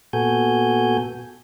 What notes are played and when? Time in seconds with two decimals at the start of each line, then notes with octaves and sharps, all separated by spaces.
0.13 A#2 B3 F#4 A4 G#5 G6